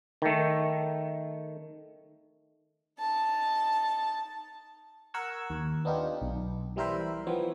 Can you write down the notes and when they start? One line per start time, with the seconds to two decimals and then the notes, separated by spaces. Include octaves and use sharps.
0.22 D#3 A3
2.99 D#4 A5
5.14 A#4 F#5 C#6 E6 G#6
5.50 D#2
5.85 B3 D4 D#4 F4 G4
6.22 B1
6.76 E3 G3 E4 A#4 C5 E5
7.27 E3 F3 B3 C4 C#5